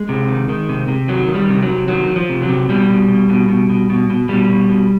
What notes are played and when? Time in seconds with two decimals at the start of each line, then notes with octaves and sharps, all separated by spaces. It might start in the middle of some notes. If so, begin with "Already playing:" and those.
Already playing: G#3
0.09 C3
0.29 D#3
0.49 D#3
0.69 C3
0.88 C3
1.08 D#3 F#3
1.28 D#3
1.35 G3
1.49 C3
1.63 F#3
1.68 C3
1.88 D#3 F#3
2.08 D#3
2.16 F3
2.29 C3
2.42 F#3
2.49 C3
2.69 B2 G3
2.90 B2
3.08 B2
3.29 B2
3.49 B2
3.70 B2
3.90 B2
4.10 B2
4.29 B2 G3
4.49 B2
4.69 B2